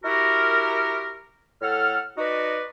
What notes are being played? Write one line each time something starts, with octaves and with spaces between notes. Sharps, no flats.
E4 F#4 G4 A#4
A2 A4 F#5 F6
D#4 F#4 B4 D5 D#5